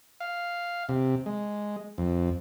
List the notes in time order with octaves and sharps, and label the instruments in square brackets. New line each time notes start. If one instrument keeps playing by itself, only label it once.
[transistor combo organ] F5
C3
G#3
F2